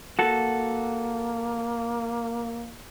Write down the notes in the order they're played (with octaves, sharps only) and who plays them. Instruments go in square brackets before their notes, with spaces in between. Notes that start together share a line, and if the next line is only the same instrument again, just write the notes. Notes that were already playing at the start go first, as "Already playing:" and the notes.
[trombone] A#3 [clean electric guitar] F#4 A4